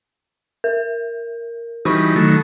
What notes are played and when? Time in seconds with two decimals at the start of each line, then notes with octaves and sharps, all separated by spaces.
0.64 A#4
1.85 E3 G3 D#4 F#4 B5 C#6
2.16 D#3 F#3 A3